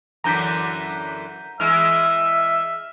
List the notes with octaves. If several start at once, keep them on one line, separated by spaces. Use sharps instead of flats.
F#2 D3 E3 A#5 G6 B6
E3 G#3 E5 E6 F6